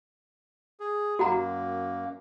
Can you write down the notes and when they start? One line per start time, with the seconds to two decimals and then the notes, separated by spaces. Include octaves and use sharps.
0.80 G#4
1.19 F#2 A#3 F#4 F#5 A#5